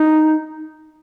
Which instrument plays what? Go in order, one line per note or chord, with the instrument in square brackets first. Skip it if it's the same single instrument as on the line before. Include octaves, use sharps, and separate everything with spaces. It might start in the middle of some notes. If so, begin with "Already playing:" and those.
Already playing: [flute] D#4